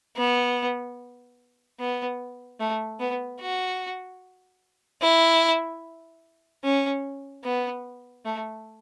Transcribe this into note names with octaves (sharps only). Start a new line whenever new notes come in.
B3
B3
A3
B3
F#4
E4
C#4
B3
A3